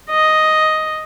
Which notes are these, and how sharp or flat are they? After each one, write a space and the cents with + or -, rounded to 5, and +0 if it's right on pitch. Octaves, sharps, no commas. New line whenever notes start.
D#5 +5